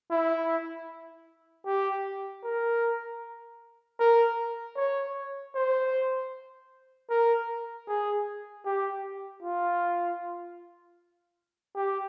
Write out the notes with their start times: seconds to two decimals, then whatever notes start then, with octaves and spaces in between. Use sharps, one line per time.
0.10 E4
1.66 G4
2.43 A#4
3.99 A#4
4.77 C#5
5.54 C5
7.10 A#4
7.87 G#4
8.65 G4
9.42 F4
11.75 G4